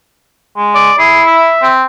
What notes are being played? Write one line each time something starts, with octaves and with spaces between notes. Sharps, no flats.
G#3
D5
E4 G#4
E5
C4